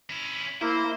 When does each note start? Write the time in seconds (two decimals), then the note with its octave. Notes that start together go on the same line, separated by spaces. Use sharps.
0.10 C#4 E4
0.61 A#3 E4 C5